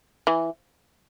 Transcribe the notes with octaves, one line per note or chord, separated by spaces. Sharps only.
E3